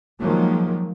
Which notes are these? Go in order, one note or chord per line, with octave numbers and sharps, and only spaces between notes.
D#3 F3 F#3 G#3 A#3